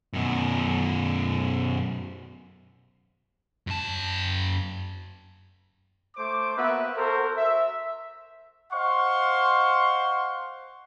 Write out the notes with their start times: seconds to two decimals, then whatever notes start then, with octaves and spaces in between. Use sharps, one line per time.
0.13 F#2 B2
3.67 F#2 A5
6.17 A3 C5 D6
6.57 A#3 B3 F#4 B4 E5
6.97 F#4 A4 A#4 C5
7.38 E5
8.72 C5 D#5 F5 F#5 C6 C#6